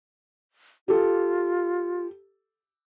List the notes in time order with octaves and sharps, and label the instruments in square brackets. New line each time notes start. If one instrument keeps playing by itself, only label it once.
[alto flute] F4 [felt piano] G4 A4